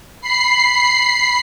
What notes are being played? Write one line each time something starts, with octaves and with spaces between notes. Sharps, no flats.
B5 C7